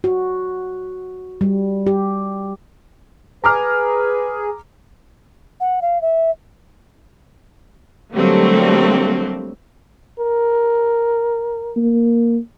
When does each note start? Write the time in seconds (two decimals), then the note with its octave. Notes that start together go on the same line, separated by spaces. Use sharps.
0.04 F#4
1.41 G3
1.87 G4
3.44 G#4 B4 A#5 D6 F6
5.60 F#5
5.82 F5
6.02 E5
8.14 D3 F#3 G3 A3 A#3 C4
10.19 A#4
11.76 A#3